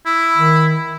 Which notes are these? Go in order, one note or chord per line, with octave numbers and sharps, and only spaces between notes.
E4
D#3